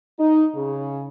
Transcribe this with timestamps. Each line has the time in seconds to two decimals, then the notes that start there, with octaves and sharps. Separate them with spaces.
0.18 D#4
0.53 C#3